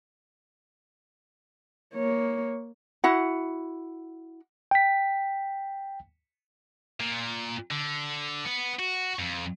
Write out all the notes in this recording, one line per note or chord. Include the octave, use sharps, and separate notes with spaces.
A#3 C#5
E4 F#4 F#5
G5 B6
A#2
D3
B3
F#4
F2